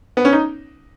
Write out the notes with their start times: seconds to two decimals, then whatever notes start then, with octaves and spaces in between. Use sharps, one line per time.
0.17 B3
0.25 C#4
0.33 D#4